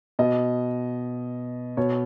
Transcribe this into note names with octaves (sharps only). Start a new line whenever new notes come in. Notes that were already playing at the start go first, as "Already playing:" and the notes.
B2 D#5
B2 C#5